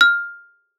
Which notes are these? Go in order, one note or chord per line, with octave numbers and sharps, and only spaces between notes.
F6